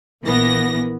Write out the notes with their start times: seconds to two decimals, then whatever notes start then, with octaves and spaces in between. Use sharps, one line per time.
0.23 A#1 E3 A#3 B3 A#6